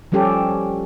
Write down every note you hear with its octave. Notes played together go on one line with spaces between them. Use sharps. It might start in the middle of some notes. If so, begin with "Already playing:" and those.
F3 G3 C#4 G4 A4